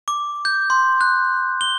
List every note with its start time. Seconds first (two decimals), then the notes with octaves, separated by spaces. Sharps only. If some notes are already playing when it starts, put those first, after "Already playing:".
0.08 D6
0.45 G6
0.70 C6
1.01 F#6
1.61 G7